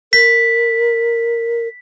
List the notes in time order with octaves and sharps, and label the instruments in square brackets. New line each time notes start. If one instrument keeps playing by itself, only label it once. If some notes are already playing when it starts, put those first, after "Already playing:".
[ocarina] A#4 [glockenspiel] B6